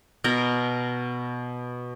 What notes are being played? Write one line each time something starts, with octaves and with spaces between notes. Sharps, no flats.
B2 A#4